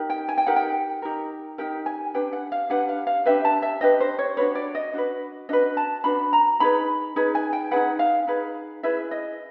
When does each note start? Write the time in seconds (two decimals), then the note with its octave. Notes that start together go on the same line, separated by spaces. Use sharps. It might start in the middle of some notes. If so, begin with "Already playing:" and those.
Already playing: D#4 G4 A#4
0.10 G5
0.28 G#5
0.37 G5
0.47 D#4 G4 A#4 F#5
0.56 G5
1.02 D#4 G4 A#4
1.58 D#4 G4 A#4 G5
1.86 G#5
2.14 D4 G4 B4 G5
2.33 F#5
2.52 F5
2.70 D4 G4 B4 F#5
2.89 F5
3.07 F5
3.25 D4 G4 B4 E5
3.45 A5
3.62 E5
3.81 D4 G4 B4 D#5
4.00 C5
4.19 C#5
4.37 D4 F#4 B4 C#5
4.55 D5
4.75 D#5
4.94 D4 F#4 B4
5.49 D4 F#4 B4 D#5
5.77 A5
6.04 D4 F#4 B4 B5
6.33 A#5
6.60 D#4 G#4 B4 B5
7.16 D#4 G#4 B4
7.35 G#5
7.53 G5
7.71 D#4 G#4 B4 F#5
7.99 F5
8.27 D#4 G#4 B4
8.83 E4 G#4 B4 E5
9.11 D#5